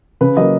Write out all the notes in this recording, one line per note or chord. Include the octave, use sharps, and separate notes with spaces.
C#3 B4
F#3 A#3 D#5